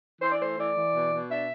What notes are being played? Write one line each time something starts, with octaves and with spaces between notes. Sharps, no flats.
E3 C5
D5
A3 C5
E3 D5
E3
B2
B2
D4 E5